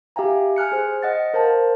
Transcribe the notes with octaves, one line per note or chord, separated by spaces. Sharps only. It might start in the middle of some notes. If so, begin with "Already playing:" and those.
G4 E5 F5 G5 G#5 A#5
G#5 F6 F#6 C#7
G#4 C5
D#5 F#5 A6
A#4 C5 F5 A5